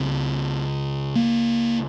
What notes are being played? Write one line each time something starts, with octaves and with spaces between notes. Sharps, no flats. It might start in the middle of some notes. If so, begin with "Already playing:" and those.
Already playing: C#2 C#3 C4
A#3